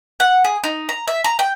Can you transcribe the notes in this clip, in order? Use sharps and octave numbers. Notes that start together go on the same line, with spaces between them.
F#5
G#4
D#4
A#5
E5
A#5
G5